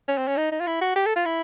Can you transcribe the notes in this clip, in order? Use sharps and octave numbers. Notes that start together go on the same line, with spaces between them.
C#4
C4
C#4
D#4
D#4
F4
E4
F#4
G4
A4
F4
E4